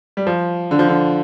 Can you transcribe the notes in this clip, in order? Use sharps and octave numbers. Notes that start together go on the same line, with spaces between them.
G3
F3
D3
F3
D3